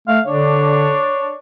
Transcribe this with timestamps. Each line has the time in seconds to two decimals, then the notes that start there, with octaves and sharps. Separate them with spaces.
0.08 A3 F5
0.27 D3 D4 C#5